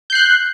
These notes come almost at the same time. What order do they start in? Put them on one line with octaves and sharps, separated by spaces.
G6 C7 F#6